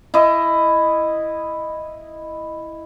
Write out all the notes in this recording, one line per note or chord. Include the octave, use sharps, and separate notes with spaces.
E4 D#5